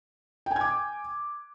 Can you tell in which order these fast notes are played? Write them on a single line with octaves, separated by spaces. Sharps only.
G5 G#5 G#6 D6